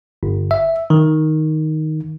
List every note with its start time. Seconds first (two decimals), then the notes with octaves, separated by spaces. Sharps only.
0.23 G1
0.51 E5
0.90 D#3